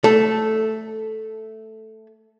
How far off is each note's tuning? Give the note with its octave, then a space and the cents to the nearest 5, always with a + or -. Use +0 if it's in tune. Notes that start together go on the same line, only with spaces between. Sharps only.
A3 +0 A4 -5